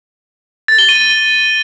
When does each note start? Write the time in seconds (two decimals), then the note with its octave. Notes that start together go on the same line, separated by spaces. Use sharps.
0.68 A6
0.79 G7
0.89 D#7